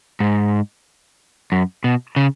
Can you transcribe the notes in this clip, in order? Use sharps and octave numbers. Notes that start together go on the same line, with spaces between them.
G#2
F#2
B2
C#3